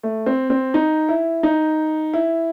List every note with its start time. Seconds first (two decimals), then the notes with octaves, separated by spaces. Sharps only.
0.03 A3
0.26 C4
0.50 C4
0.74 D#4
1.09 E4
1.43 D#4
2.13 E4